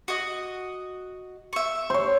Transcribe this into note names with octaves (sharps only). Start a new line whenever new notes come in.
F#4 D#5
E5 C#6
C5 C#5